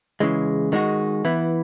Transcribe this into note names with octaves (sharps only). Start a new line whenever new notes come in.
C#3 E3 G#3
D#3 G#3 D#4 F#4
E3 B3 E4